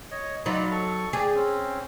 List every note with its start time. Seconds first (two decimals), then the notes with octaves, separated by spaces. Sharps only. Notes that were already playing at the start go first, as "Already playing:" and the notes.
0.11 C#5 D#5
0.46 F#3 D#4 F4 D5 B5
0.71 A4 C#6
1.13 G4 G#4 D5
1.35 C4 C#4